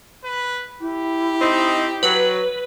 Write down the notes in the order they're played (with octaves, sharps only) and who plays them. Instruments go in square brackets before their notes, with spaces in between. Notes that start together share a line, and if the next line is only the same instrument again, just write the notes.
[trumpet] B4
[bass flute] E4 [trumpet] G4
[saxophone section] C4 D#4
[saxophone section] F#3 [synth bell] B4